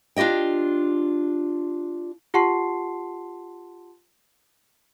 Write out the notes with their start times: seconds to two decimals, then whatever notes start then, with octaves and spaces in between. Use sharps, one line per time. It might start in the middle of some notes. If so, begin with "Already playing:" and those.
0.16 D4 F4 G4 D#5 G5
2.34 F4 G4 F#5 A5 C6 C7